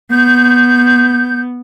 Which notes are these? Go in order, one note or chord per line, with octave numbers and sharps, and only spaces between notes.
B3 G6